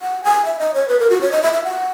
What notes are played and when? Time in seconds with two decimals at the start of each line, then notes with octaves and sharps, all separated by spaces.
0.02 F#5
0.24 G#5
0.45 E5
0.59 D#5
0.74 C#5
0.88 B4
0.99 A#4
1.10 F#4
1.21 C#5
1.32 D#5
1.43 E5
1.53 E5
1.64 F#5